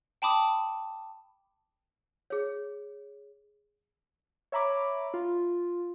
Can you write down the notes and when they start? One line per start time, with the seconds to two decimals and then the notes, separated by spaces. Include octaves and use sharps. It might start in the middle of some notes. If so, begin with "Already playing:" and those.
0.22 G5 A5 B5 D6 D#6
2.30 G#4 C#5
4.52 C#5 E5 A#5 B5 D6
5.14 F4